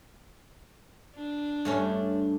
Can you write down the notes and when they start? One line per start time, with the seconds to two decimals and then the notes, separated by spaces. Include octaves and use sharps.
1.15 D4
1.65 G2 A3 C#4